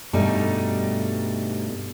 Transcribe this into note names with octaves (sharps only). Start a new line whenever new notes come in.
G2 B2 G3 A3 D#4